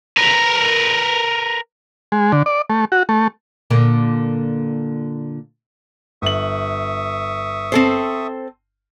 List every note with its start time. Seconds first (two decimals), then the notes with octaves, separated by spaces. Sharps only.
0.17 A#4 B4
2.12 G#3
2.32 D3
2.46 D5
2.70 A3
2.92 F#4
3.09 A3
3.70 A#2 D3 A#3
6.22 G1 E5 C#6 D#6 F#7
7.72 C4 A4 C5